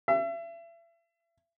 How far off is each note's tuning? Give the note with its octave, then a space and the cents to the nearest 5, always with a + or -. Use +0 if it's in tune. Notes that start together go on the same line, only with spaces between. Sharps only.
E5 +35